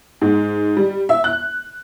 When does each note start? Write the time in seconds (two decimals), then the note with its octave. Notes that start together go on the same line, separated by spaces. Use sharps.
0.21 G#2
0.77 G3
1.09 E5
1.24 F#6